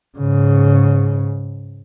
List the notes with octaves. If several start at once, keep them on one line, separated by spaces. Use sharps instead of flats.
G#2 C#3